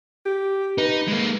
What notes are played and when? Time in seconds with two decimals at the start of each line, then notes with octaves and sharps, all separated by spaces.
0.26 G4
0.78 D#4 B4
1.08 G#3 A#3